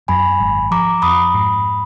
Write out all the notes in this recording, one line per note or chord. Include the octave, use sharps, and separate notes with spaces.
F#2 G#5 B5
G#1
F3 A#5 D6
F2 B5 D#6
G#2